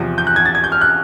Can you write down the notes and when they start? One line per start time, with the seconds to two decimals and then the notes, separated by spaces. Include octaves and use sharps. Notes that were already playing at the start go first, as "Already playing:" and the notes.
Already playing: E2 C3 F3
0.18 G6
0.27 F#6
0.36 G#6
0.46 A6
0.55 G#6
0.64 G6
0.72 F6
0.81 F#6